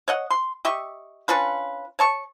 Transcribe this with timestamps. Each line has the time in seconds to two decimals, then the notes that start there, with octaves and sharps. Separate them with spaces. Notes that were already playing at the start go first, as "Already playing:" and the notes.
0.08 C#5 D#5 F#5
0.31 C6
0.65 G4 D#5 E5 C#6
1.28 C#4 D4 F4 B4
1.99 C#5 A5 C#6